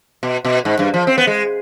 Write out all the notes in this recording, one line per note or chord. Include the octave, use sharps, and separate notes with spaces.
B2
B2
G#2
G2
F3
C4
B3
G#3